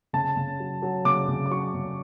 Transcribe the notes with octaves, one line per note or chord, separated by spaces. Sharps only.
C#3 A5
C#3
F#3
F#3
C#3 D6
C#3
D6
F#3 C#6
C#3